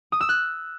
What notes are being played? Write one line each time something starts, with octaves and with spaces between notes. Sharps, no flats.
D#6
E6
F#6